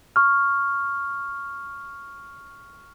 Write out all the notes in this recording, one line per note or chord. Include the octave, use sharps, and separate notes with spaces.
C#6 F6